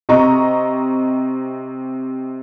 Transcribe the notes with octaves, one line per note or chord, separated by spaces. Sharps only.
C3 D#5 A#5 C#6